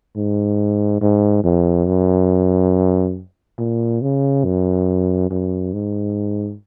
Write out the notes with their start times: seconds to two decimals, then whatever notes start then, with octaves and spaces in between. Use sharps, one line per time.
0.16 G#2
1.01 G#2
1.44 F2
1.87 F#2
3.59 A#2
4.02 C#3
4.45 F#2
5.30 F#2
5.73 G#2